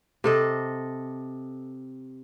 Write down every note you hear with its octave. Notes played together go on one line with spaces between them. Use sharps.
C3 A4 D#5